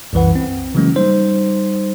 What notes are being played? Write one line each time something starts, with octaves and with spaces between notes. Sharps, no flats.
C2 F#2 E3 B4 F#5
C4
C#3 E3 F#3 G#3 A#3 C#4
G3 D#4 C5